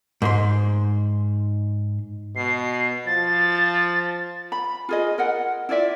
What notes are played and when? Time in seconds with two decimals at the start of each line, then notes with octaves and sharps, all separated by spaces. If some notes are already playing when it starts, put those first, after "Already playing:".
0.22 G#2 C5 C6
2.36 B2 C7
3.07 F3 A6
4.52 B5
4.89 F4 G#4 D#5
5.18 A#4 D#5 F#5
5.69 E4 F4 D5 E5